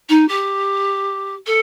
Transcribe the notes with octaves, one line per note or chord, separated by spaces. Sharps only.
D#4
G4
A4